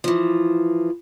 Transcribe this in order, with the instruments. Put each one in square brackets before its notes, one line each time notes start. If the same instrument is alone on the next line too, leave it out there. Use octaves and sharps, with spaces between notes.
[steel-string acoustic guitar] E3 F3